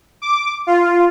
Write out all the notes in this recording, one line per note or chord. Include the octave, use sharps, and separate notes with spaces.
D6
F4